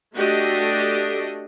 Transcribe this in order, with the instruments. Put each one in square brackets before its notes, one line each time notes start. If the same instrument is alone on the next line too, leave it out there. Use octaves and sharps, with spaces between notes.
[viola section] A3 D4 F#4 G4 A4 D#5